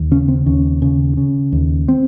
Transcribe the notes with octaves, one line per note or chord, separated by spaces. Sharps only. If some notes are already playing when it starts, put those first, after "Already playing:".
Already playing: D#2
C#3 C#4
C4
D#2 C#4
C#3
C#3
D#2
C4